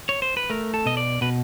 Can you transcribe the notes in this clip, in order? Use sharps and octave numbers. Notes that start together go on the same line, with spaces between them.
C#5
C5
B4
A3 A#4
A4
B2 D#5
D5
B2 B4